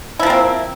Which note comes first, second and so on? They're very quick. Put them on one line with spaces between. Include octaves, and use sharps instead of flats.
E4 F3 A#3 C4